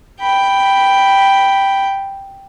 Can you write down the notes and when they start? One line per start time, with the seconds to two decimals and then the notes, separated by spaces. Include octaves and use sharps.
0.20 G5 B5